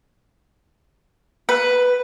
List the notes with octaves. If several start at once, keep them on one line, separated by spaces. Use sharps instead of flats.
B4